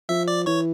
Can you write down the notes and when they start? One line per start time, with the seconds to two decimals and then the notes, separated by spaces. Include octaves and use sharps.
0.09 F3 E5 E6
0.28 D5 D6
0.46 E3 C#5 C#6